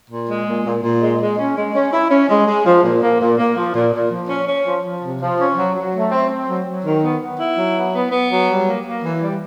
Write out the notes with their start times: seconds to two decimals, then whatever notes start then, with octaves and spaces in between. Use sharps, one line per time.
0.11 A#2
0.29 G#3
0.47 A#2
0.65 A#2
0.83 A#2
1.01 G#3
1.20 G#3
1.38 C#4
1.56 G#3
1.75 C#4
1.93 E4
2.11 C#4
2.29 G#3
2.47 G#3
2.65 F3
2.83 A#2
3.02 A#3
3.20 A#2
3.38 A#3
3.56 F3
3.75 A#2
3.93 A#2
4.11 F3
4.29 C#4
4.48 C#4
4.66 F3
4.84 F3
5.02 C3
5.20 F3
5.39 C#4
5.57 F#3
5.75 F#3
5.94 A3
6.11 C4
6.30 C4
6.48 F#3
6.66 F#3
6.84 D#3
7.03 B3
7.21 B3
7.39 E4
7.57 F#3
7.75 B3
7.93 B3
8.12 B3
8.30 F#3
8.48 G3
8.66 A#3
8.85 A#3
9.03 E3
9.21 G3